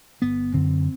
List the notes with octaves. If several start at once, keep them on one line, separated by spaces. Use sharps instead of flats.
G1 B3
F#2 D3 C4